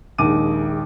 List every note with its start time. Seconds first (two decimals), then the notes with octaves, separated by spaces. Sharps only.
0.18 A#1 D#2 G#3 D#4 D6 D#7